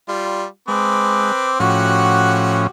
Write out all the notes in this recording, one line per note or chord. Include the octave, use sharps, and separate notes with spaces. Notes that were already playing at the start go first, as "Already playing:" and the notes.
G3 F4
G#3 C4 B4 D6
A2 F3 C#4 F#4 G4 F#5